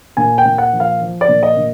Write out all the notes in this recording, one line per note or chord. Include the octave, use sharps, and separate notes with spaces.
A#2 G#5
G5
A#2
F#5
F3
F5
F3
D5
A#2
D#5
A#2